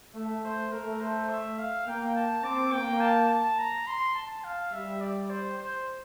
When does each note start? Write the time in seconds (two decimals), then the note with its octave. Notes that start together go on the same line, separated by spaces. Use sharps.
0.15 A3 E5
0.44 C5
0.72 A3 A#4
1.01 C5
1.30 E5
1.58 F5
1.87 A#3 G5
2.15 A5
2.44 C4 D6
2.72 A#3 G5
3.01 A5
3.29 A5
3.58 A#5
3.87 C6
4.15 A5
4.44 F5
4.72 G3 E5
5.01 D5
5.30 C5
5.58 C5